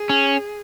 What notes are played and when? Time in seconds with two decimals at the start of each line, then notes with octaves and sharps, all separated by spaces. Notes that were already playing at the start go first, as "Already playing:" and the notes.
Already playing: G#4
0.09 C#4